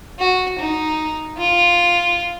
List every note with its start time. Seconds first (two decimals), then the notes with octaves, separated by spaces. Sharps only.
0.20 F#4
0.59 D#4
1.38 F4